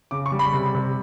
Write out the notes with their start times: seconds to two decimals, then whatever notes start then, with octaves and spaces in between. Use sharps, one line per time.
0.11 C#3 D6
0.26 C#6
0.32 G3
0.39 B5
0.53 C3
0.74 C3